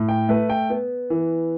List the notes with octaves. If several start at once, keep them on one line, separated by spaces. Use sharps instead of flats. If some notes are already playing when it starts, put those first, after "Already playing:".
Already playing: A2
G5
A3 B4
G5
B3
E3